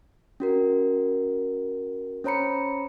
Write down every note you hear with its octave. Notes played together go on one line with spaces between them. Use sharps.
C#4 F#4 A#4
C#4 C5 C#5 A#5 B5 C#7